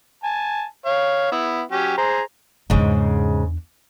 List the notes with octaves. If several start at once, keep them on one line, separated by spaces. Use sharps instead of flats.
G#5 A5
C#5 F5
B3 E4
F#3 C#4 G4
G#4 C5 A#5
E2 G#2 C#3 D4